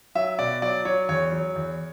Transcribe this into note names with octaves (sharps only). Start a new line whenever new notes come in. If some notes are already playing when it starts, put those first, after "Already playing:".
F#3 E5
B2 D5
F#3 D5
F#3 C#5
E2 C#5
F#3
E2